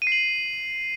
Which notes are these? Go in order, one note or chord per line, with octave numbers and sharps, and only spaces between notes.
D#7
C7
F#7